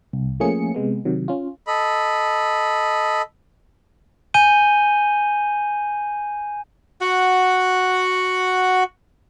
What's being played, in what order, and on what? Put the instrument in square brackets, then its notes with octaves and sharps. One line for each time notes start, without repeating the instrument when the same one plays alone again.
[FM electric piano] C2
F3 A3 A#3 C#4 G#4 C#7
C3 G#3 B3
C3 D#3 F#3
C#4 F4
[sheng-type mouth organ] A4 D#5 B5
[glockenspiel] G#5 G6 D#7 G7
[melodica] F#4 F#5